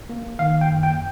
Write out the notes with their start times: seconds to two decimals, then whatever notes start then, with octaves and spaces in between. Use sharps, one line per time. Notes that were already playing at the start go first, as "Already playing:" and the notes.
0.10 A#3
0.39 D#3 F5
0.61 G5
0.69 F#2
0.83 G5